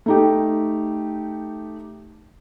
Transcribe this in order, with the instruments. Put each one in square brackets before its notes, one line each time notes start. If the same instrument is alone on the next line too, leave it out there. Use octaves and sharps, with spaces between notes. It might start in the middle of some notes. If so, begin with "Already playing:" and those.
[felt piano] A3 D#4 G4